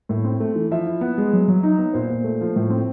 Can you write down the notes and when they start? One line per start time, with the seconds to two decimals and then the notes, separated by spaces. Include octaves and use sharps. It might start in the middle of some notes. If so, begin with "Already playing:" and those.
0.09 A2
0.25 C4
0.40 A3
0.55 E3
0.71 F3 E5
0.86 E4
1.01 B3
1.18 G#3
1.33 F#3
1.48 F#3
1.63 D#4
1.78 B3
1.94 A#2 C5
2.10 A#2
2.24 A3
2.41 F3
2.56 A2
2.70 C4